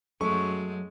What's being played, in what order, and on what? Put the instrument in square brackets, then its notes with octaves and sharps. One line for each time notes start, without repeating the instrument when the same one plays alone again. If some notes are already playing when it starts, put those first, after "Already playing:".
[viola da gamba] F#2 G#3 [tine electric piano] F#3 [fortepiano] A3 [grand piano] C#6